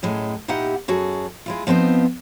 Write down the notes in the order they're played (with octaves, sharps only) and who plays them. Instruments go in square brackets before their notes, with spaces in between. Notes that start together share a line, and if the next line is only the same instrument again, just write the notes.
[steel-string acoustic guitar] F#2 A2 G#3
A#2 D#4 E4 G4 F#5
F#2 F#4 G#4 A4
G#3 E4 F4
F3 B3 C4 D#4 C5